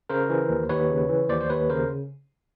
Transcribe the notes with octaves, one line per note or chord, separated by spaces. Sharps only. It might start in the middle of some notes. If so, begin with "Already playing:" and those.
C#3 A#4 C5
E3
D#2
D#2 B4 C#5
C#3
E3
D#2 C5 D5
C5
D#2 B4 C#5
C#3 A#4 C5